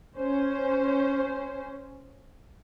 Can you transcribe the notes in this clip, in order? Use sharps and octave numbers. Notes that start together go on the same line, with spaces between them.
C#4 C5